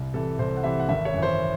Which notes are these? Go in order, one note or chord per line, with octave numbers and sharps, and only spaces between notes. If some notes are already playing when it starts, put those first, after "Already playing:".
Already playing: C2
C3 E3 A4
C2 C5
F#5
C3 E3 E5
F#5
G#1 E5
C#5
F#2 E3
C5